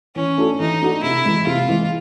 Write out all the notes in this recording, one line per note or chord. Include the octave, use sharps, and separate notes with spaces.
E3 C#4
A3 D4 F#4 A4
E3 D#4
A3 D4 F#4 A4
C3 E4
E3 G#3
C3 F4
E3 G#3